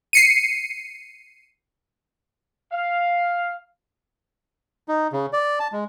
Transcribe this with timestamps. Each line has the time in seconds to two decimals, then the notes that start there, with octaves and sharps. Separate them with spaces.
0.13 C7 C#7 D#7
2.72 F5
4.88 D#4
5.12 C#3
5.33 D5
5.60 A5
5.73 G#3